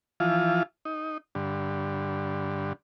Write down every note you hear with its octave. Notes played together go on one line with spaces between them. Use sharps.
E3 F3 F4
D#4
G2 D3